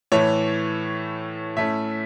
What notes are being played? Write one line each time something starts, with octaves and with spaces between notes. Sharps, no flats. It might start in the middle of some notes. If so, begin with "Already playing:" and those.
A2 E3 A3 C#5
A2 A3 C#4 E5